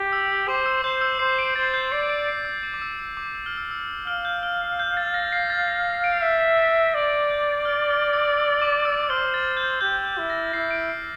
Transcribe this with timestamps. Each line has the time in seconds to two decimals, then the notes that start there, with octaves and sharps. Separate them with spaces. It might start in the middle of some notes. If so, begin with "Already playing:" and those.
Already playing: G4
0.12 E6
0.48 C5 D6
0.66 E6
0.84 C5 G6
1.01 E6
1.19 C5 C7
1.38 D7
1.56 C5 A6
1.74 G6
1.92 D5 C7
2.10 D7
2.28 C7
2.45 E6
2.63 D6
2.74 D6
2.81 E6
3.00 E6
3.17 D6
3.35 E6
3.46 F6
3.57 E6
3.71 E6
4.07 F5 F6
4.25 G6
4.43 F6
4.79 G6
4.97 A6
5.14 A#6
5.32 C7
5.50 A6
5.68 A#6
6.04 D7
6.22 E5 A6
6.59 A6
6.94 D5 A6
7.30 G6
7.65 F6
7.90 F6
8.13 E6
8.38 E6
8.62 D6
8.85 E6
9.10 C5 F6
9.34 A6
9.57 G6
9.81 G4 G6
10.05 G6
10.18 E4
10.30 A#6
10.53 E4 C7
10.71 D7
10.89 C7